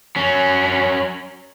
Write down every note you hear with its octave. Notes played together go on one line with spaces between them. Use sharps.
F#3 C#4